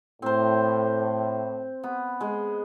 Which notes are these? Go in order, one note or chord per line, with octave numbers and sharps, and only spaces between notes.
A2 C4 C5
B3
G#3